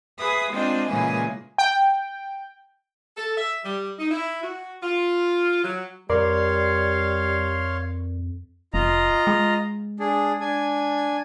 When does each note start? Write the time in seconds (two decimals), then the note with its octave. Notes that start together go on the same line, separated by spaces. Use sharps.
0.18 G#4 B4 E5 D#6
0.51 G#3 C4 D4 F4 D#5
0.89 A#2 C#3 E3 G#3 A#3 G#4
1.58 G5
3.17 A4
3.37 E5
3.64 G3
3.99 D#4
4.11 E4
4.42 F#4
4.82 F4
5.63 F#3
6.10 F2 G3 A#4 C#5 D5 F5 C6
8.74 F1 F4 D#5 A#5
9.27 G#3
10.00 D4 G#4
10.41 D4 G#5